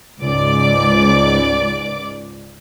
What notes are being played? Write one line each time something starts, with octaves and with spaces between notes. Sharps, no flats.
C#2 G#2 D5 D6